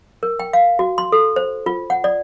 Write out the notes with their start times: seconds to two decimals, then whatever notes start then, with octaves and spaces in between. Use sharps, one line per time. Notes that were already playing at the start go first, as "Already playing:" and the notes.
0.23 A#4
0.40 G5
0.53 F5
0.79 F#4
0.98 C6
1.12 A4
1.36 C5
1.66 F4
1.90 F#5
2.04 D5